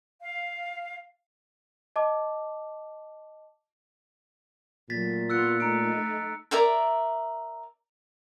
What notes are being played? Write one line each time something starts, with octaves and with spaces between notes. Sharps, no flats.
F5
D#5 A5 D6
A#2 F#3 A3 A6 B6
B3 F4 E6 F#6 C#7
A3 D#4 A#5 C#7 D7
A#4 D5 E5 A#5